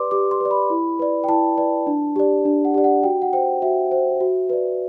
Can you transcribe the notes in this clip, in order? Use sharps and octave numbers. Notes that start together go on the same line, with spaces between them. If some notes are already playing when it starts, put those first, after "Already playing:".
Already playing: G4 B4 D5 C6 D6
G4 D6
C6
B4 D5
B5
E4
B4 D5
G5
E4 A5
B4 D5
D4
G4 D5
D4
F#5
G4 D5
F#5
F#4 G5
F#5
C5 G5
F#4 E5
C5
F#4
B4 D5